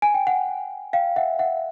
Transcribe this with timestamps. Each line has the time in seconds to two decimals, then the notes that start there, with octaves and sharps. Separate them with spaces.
0.02 G#5
0.14 G5
0.27 F#5 G#5
0.93 F5 G5
1.16 E5 F#5
1.39 E5 F#5